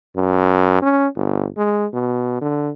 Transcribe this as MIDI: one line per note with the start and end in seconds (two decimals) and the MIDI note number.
0.16 0.81 42
0.82 1.07 61
1.16 1.48 31
1.57 1.86 56
1.94 2.38 47
2.41 2.71 50